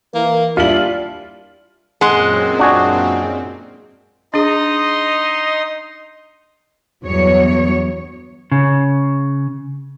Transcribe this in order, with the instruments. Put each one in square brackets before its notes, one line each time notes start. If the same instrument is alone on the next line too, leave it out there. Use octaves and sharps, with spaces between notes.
[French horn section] E3 A#4 [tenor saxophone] A#3
[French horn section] A#2 G3 D4 [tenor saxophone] E4 [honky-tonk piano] F4 F#7
[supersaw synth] F#2 A#2 C4 [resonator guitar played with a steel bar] G#3 [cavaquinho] F#5 C6
[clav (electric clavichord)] D4 F#4 G#4
[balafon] D4 G#4 [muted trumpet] D#4 [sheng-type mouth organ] D#5 C6
[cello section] E2 G2 F#3 C#5
[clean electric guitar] C#3